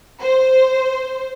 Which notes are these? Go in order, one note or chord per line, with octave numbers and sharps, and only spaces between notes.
C5